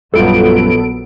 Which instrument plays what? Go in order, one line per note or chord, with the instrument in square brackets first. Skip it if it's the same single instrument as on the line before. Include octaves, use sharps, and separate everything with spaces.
[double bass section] A#1 F#3 B3 [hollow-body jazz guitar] F#2 G3 F4 [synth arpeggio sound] A4 D7